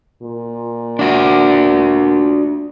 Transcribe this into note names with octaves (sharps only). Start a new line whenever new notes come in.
A#2
D4 F#4